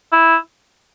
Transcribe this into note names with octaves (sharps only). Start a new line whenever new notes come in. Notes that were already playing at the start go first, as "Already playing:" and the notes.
E4